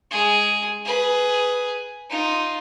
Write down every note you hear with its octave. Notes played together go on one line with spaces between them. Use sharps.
G#3 G#4
G#4 B4
D#4 F4